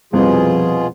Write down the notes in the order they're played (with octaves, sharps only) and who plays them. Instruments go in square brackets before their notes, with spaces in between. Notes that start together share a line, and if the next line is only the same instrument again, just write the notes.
[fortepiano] C2 F2 [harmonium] B2 F4 G#4 [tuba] F3